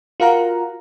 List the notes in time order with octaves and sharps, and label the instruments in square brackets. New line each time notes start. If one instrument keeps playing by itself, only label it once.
[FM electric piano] F4 F#4 A#4 F5 F#5 A#5